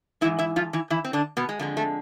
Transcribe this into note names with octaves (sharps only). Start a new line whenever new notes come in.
G#2 E3 G#3 E4 E5
E4 E5
F3 F4
E3 E4
E3 E4
C4
D3 D4
B2 B3
G#3
F2 D3 G#3 A3
A3